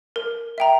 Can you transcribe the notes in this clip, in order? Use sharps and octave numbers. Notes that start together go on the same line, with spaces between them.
A#4
E5 G5 A#5